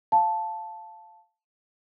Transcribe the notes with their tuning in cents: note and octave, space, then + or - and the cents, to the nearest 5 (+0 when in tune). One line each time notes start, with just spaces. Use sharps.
F5 +0 A5 +0